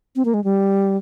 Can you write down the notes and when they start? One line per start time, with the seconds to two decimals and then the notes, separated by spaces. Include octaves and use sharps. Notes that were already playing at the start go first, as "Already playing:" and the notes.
0.16 C4
0.25 A#3
0.34 G#3
0.44 G3